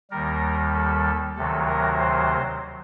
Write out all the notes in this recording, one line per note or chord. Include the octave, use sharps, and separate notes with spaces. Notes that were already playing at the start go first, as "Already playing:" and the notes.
D#2 D#3 G3 A#4
A4
D2 C3 D#3 F#3 A4
A#4
C5